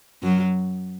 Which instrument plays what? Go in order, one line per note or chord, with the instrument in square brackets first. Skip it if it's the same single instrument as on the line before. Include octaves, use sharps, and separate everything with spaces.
[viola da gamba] F#2 F#3